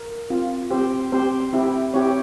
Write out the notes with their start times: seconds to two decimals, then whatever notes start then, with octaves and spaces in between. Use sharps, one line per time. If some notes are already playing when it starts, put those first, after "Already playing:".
Already playing: A#4
0.30 C4 F4
0.70 C4 G4 C5
1.12 C4 G4 C5
1.53 C4 E4 G4
1.94 C4 E4 G4 C#5